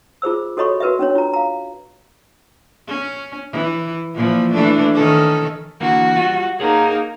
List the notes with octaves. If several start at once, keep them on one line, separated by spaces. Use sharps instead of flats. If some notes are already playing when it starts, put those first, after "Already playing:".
F4 G#4 C5 E6
F#4 A4 C#5 D#5 B5 C#6
F#4 A#4 B4 D#5 E5
C#4 D4 C#5
F4 A#5
F5 A#5
C#4
E3
A#2 E3 F3
E3 A3 D4
D#3 C#4 A4
D3 E3 A#3 F#4
G3 F4
A#3 D#4 G#4 C#5 F#5